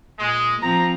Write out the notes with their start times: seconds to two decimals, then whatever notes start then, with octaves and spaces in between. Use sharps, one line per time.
0.19 A#2 G#3
0.62 F3 C4 A#5